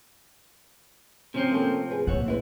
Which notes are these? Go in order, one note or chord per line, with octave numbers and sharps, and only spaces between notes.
C3 F3 C4 C#4
A#3 C#4 A4
G#4 B4
A#2 C#5 E5 F#5
C4 E4 B4